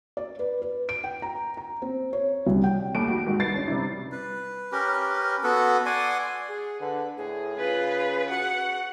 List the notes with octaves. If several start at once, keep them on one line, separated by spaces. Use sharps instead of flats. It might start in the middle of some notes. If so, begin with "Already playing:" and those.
D5
B4
B4
D7
G5
A#5
A#5
C4
C#5
C2
G5
D#2 G3 A3 D7
G3 F#4 G4
G#2 D#3 F#4
C2 B4 A6 C7
C#4 D4
C3 G3 E4
B4
C#4 G4 A#4 B4
B3 F#4 A4 B4
D5 F#5 G#5 C6
G#4
D3 B4
A2 G#4
C#3 F4 B4
F#4 F#5